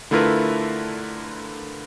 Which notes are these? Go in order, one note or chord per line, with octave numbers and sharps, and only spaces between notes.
D3 A3 E4 F4 A#4 B4